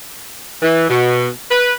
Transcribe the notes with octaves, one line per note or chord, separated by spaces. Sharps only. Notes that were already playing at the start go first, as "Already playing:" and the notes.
E3
B2
B4